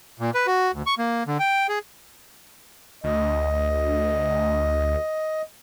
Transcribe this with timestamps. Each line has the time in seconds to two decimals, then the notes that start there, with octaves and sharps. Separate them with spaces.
0.20 A#2
0.34 B4
0.47 F#4
0.73 D2
0.86 C#6
0.98 A#3
1.27 D3
1.39 G5
1.69 G#4
3.04 D2 D#5